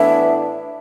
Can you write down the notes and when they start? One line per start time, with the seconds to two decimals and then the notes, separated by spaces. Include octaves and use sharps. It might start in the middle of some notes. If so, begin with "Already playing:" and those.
Already playing: A2 E3 B3 D4 E5